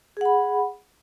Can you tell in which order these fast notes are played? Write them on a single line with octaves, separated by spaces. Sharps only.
G#4 F#5 B5